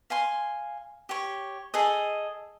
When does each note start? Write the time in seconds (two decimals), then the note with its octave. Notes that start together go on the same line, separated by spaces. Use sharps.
0.10 F5 G#5 C6
1.09 G4 C#5
1.74 G#4 A4 D#5